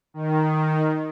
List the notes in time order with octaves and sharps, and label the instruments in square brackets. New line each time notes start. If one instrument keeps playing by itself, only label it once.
[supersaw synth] D#3